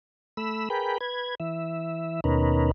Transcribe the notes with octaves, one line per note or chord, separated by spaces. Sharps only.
A3 B5 E6
G#4 A#4 B4 G5 B5
B4 G#6
E3 E5
D#2 B2 C#4 D#4 A#4 B4